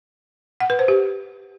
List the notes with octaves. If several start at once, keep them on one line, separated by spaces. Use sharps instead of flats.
F#5
B4
C5
G4